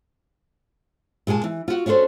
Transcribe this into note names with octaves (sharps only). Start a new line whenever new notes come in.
A#2 G#3 G#4 G#5 A5
E3
F4 F#4
C#4 D4 F#4 A4 C5